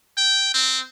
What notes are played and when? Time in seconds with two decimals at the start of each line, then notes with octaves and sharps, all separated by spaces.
0.17 G5
0.54 C4